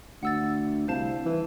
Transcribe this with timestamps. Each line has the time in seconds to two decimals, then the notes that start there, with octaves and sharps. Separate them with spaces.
0.23 D2 F#5 E6 A6
0.88 C2 C5 F5 A5
1.25 E3